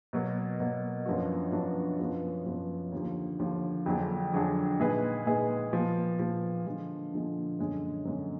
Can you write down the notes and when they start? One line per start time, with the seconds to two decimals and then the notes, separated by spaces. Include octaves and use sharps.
0.13 B2 F#3 A#3
0.60 B2 F#3 A#3
1.06 F#2 F3 B3 D4 F#4
1.52 F#2 F3 B3 D4 F#4
1.99 F#2 F3 B3
2.46 F#2 F3 B3
2.92 D#2 D3 F3
3.39 D#2 D3 F3
3.86 F2 D3 F#3 D4 G#4
4.33 F2 D3 F#3 D4 G#4
4.79 A#2 G#3 D#4 G#4 B4
5.26 A#2 G#3 D#4 G#4 B4
5.73 A#2 F3 B3
6.19 A#2 F3 B3
6.66 D3 F3 G#3
7.12 D3 F3 G#3
7.59 F#2 D3 G#3
8.05 F#2 D3 G#3